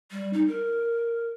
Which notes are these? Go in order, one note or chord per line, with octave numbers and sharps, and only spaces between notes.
G3
D#4
A#4